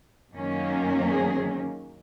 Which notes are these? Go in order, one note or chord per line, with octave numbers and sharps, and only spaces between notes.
F#2 D#3 F#3 A#3 C#4
G#4